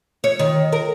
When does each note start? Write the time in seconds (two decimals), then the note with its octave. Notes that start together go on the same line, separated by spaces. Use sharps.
0.24 C#5
0.39 D#3
0.73 A#4